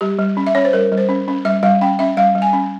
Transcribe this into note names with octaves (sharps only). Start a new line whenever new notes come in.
G3 G4
G3
C#4
E5
C#4 C#5
C5
G3 A#4
G3
C5
C#4
C#4
G3 E5
G3 F5
C#4 G5
C#4 E5
G3 F5
G3
G#5
C#4